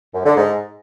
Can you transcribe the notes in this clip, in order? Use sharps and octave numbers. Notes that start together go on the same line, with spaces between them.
F#2
D3
G#2